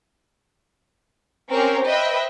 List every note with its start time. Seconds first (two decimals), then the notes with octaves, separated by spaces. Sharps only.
1.50 C4 C#4 G4 A#4 C5 C#5
1.86 B4 C5 D#5 E5 G5 B5